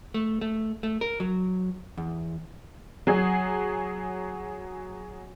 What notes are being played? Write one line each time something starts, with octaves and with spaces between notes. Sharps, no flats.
A3
A3
A3
A#4
F#3
E2
F#3 G#4